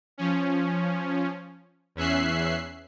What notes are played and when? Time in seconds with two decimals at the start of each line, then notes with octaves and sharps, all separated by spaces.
0.18 F3 C#4
1.95 E2 C#4 E5 F#6 C7